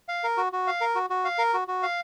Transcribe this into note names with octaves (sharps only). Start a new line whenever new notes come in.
F5
A#4
F#4
F#4
F5
A#4
F#4
F#4
F5
A#4
F#4
F#4
F5